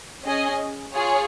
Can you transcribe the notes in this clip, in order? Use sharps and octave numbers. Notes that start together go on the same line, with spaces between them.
C#4 G#4 D#5 G#5
F4 G#4 C#5